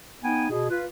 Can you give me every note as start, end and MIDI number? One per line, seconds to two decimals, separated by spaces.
0.23 0.46 59
0.23 0.46 63
0.23 0.46 79
0.23 0.46 80
0.50 0.69 47
0.50 0.69 68
0.70 0.83 65
0.70 0.83 71